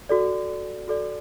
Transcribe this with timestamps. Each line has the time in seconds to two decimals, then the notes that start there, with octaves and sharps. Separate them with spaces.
0.09 F#4 A4 D5
0.88 F#4 A4 D5